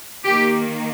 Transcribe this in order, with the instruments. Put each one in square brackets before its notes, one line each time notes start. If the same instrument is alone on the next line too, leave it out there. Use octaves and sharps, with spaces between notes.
[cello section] D#3 A#3 G4